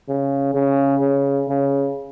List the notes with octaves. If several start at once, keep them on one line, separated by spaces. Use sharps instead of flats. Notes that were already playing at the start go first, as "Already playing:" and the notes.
C#3
C#3
C#3
C#3